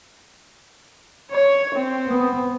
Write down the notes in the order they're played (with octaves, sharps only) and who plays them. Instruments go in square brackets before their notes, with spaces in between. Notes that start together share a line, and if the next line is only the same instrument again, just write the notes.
[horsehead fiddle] C#5
C4
[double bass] B3